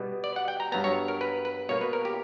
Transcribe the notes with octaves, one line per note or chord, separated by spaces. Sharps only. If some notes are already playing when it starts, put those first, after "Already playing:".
Already playing: B2 G3 B3
D5
F#5
G5
A#5
G2 F#3 B3 A#5
C#5
A#4
B4
B4
B2 A#3 C#5
B4
A#4
G4